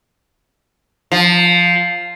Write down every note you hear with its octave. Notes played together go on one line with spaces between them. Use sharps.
F3